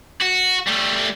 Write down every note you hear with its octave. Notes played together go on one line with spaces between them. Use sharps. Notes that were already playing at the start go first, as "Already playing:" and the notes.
F#4
G3 A3